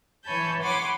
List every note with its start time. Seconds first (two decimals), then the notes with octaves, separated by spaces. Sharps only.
0.24 E3 C#5 G#5 A5 B5 G6
0.61 C#5 F#5 G#5 B5 C6 D6